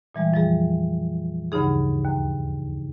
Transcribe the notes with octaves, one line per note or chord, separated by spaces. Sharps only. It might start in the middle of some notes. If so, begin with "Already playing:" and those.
A#2 E3 G3 G#3
F2 F3 G3 G#4
D2 G2 C#3 D#4 G#4
D#2